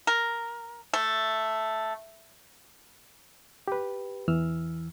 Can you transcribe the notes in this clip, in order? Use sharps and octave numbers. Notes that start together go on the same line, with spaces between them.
A#4
A3
G4 B4
E2 E3 E6 F6